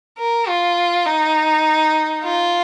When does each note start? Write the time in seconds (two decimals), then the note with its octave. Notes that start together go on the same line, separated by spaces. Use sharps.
0.18 A#4
0.48 F4
1.06 D#4
2.23 F4